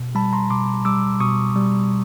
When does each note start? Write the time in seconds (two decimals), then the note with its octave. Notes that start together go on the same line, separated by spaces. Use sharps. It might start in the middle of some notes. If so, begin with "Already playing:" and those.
Already playing: B2
0.15 G3 A5 B5
0.33 A#5 C6
0.50 B2 C6 D6
0.85 G3 D6 E6
1.20 B2 C#6 D#6
1.56 G3